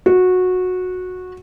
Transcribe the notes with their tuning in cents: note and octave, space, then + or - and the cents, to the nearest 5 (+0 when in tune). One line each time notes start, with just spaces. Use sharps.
F#4 -15